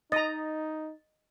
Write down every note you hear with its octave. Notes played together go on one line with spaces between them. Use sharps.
D#4 D#5 A#5 A6